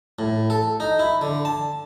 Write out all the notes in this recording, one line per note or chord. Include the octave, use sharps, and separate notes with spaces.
A2
A4
D#4
E4
D3
A5